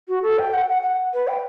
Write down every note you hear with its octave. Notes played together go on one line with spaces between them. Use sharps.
F#4
A4
G5
F#5
F#5
F#5
B4
G5